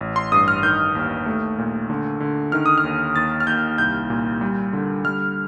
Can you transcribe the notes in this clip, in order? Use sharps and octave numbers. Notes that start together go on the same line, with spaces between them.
A1
C6
G2 D#6
F6
D#3 G6
D#2
A3
A#2
D3
D3
D#3 F6
D#6
F6
D#2
D#2 A6
F6
D#2 G6
C2 G6
A#2
G3
D3
G3 F6